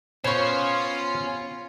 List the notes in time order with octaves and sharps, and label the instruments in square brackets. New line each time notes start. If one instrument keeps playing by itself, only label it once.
[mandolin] B3 C#6 [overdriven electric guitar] C#4 [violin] F4 [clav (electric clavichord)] C5 C#5